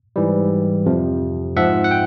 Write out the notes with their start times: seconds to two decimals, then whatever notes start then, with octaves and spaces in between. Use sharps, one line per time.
0.16 G#2 E3 G3
0.86 F2 C3 F3
1.57 G#2 F3 E5 F#5
1.84 F#5
1.91 G5